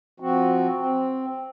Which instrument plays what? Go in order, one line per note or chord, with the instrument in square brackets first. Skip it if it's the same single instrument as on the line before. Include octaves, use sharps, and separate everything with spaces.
[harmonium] F3 C4 F#4
C4